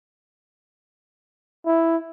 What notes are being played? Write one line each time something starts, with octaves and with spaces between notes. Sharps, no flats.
E4